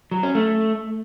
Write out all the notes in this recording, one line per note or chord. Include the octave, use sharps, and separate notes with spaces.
F#3
C#4
A3